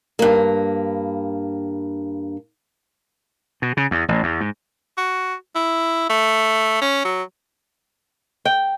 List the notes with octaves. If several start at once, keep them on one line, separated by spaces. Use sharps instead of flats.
G2 A#3
B2
C#3
E2
A1
E2
G#2
F#4
E4
A3
C#4
F#3
G5